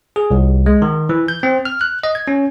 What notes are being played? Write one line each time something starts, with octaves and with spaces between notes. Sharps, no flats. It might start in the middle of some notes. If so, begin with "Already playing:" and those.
G#4
C2
G#3
D#3
E3
G6
C4
F6
F#6
D#5
G#6
C#4